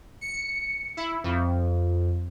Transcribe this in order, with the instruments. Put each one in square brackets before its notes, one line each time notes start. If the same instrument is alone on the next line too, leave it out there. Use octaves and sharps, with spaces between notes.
[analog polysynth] C#7
E4
F2